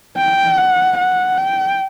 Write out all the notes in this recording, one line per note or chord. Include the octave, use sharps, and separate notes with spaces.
G5
F#5
F#5
G5